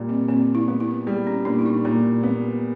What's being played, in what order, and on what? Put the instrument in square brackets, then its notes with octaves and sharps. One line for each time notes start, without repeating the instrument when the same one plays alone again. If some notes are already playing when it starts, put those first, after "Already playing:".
Already playing: [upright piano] A#2 G3
[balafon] C4
[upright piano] A#2 [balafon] C4
[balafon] E4
[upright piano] B3
[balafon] E4
[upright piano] G3
[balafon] C#4
[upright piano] A#2 [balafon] D4
[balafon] E4
D#4
[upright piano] A#2
B3